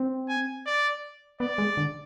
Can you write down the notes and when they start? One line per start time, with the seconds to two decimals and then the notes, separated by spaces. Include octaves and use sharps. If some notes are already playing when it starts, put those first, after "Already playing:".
Already playing: C4
0.29 G#5
0.66 D5
1.40 B3 D5
1.58 G#3
1.77 D3